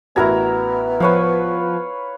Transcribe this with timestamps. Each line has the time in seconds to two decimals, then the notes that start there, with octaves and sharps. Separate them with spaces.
0.16 A1 B3 E4 F#4 A#4 A#5 G#6
1.00 F3 B4 C#5 F5